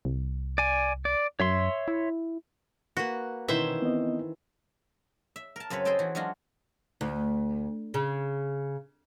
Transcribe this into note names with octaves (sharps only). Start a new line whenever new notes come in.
C2
D5 G#5
D5
F#2 C#5 E5 C6
E4
A#3 F#4 B4
B2 D#3 E3 C#4 C5 E5
B3 C4 D#5
E5
A#4 A5
F#2 C#3 C4 B4 C#5
G#4 A4 C5 D#5 G5 A5
E3 F#4
F#3 G#3 C#4 D4 F4 F#4
D2
C#3